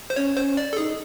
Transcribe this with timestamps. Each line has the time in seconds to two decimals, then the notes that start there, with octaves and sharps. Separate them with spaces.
0.10 C5
0.16 C#4 C#5
0.36 C#4 C5
0.57 D5
0.73 A4
0.77 D#4 G#4